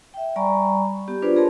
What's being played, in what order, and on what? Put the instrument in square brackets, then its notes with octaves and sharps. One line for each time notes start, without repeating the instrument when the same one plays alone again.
[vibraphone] E5 G5
G3 D5 G#5 A#5 B5 C#6
B3 G4
D4 F4 G#4 B4 C5 D5
B3 G#4 A#4 C#5 A5 C6